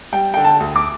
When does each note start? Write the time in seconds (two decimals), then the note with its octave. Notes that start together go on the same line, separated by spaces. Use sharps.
0.12 G3 G5
0.34 D3 G5
0.44 A5
0.60 D2
0.76 D6